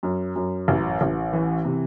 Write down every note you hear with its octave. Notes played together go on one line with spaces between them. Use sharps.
F#2
F#2
A1
A1
E3
C3